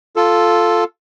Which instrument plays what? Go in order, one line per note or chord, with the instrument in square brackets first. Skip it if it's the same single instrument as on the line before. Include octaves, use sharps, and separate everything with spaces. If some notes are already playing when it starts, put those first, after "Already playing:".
[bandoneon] F4 A4